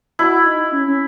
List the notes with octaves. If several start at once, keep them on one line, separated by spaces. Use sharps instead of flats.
E4 F#4
D#4
C#4
C#4